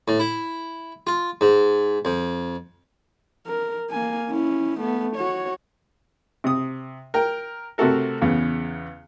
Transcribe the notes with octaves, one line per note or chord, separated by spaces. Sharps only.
A2
E4
F4
G#2
F2
A#4
A#3 G#5
C#4 E4
A3 B3
F#4 C#5
C3 D#6
A#4 G5
C3 A3 F#4 A4 A#4
E2 C#3 B3